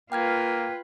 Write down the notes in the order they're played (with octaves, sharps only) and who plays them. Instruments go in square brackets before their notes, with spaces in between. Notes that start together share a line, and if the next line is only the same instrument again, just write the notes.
[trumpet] A#3 [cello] F4 B4 [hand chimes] G5 F6 G#6